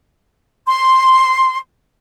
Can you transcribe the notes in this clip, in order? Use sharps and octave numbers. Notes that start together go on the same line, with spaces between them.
C6